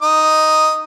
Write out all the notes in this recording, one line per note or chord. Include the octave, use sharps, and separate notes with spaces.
D#4 D#6